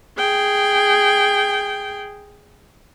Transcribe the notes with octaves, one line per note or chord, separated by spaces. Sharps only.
G#4 G5